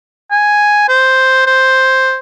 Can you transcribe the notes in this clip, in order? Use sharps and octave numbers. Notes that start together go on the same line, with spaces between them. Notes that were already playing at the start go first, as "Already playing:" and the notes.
G#5
C5
C5